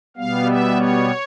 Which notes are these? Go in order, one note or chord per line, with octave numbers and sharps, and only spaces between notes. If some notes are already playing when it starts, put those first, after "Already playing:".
B2 G3 B3 F5
E5
C#5